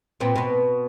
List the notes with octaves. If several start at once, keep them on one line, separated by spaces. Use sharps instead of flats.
A#2 B3 C4
B2 B3